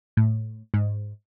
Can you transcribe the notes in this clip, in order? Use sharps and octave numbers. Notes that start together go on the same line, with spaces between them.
A2
G#2